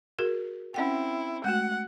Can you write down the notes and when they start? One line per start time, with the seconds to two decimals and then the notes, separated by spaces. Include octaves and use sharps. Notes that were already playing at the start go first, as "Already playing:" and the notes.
0.19 F#4 G#4 A#4
0.74 C4 C#4 E4 F#5 G5
1.44 G#3 A3 F#4 F#5